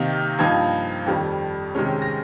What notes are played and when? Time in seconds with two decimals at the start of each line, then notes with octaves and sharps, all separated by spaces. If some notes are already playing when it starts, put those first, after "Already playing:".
Already playing: C3 D#3 A#3 D#4
0.39 G2 F3 A#3 D#4 G#6
1.06 F2 D#3 G3
1.75 C3 D#3 G#3 C#4
2.02 A#6